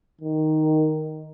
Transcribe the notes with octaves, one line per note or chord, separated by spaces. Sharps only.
D#3